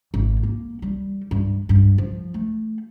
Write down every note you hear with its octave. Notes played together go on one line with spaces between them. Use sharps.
G#1
A#3
G3
G2
G2
F3
A3